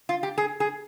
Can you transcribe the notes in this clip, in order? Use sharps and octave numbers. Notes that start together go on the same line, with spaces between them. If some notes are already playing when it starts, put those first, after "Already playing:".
F4
G4
G#4
G#4